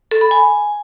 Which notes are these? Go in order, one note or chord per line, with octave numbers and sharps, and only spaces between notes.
A4
B5
G#5